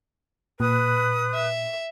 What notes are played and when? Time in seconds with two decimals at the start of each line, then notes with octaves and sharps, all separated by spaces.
0.60 A#2 B4 D#6 F#6
1.34 E5